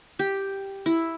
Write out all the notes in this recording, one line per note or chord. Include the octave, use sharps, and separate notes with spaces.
G4
E4